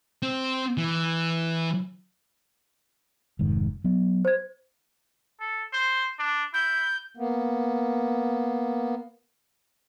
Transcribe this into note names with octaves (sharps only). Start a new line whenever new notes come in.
C4
E3
F1 G#2 D#3
F#3 B3
C5 G#6
A4
C5
D4
E4 G6
A#3 B3